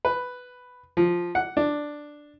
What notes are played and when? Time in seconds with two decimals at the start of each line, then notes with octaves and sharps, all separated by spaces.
0.05 B4
0.97 F3
1.35 F#5
1.57 D4